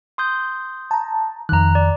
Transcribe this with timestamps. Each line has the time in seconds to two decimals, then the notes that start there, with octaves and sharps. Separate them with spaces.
0.18 C6 D#6 G6
0.91 A5 A#5
1.49 F2 D#3 A#5 F#6
1.75 D5